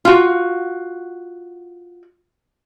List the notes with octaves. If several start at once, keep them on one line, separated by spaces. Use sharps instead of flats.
F4 F#4